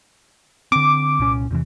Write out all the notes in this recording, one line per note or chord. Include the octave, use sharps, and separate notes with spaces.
D3 C4 D6
C2 A#2 C#4
E2 C3 E3